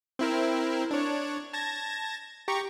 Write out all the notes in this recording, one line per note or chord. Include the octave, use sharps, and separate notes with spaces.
C4 E4 A#4
D4 C#5
A5 G#6 A#6
G4 A#5 C#6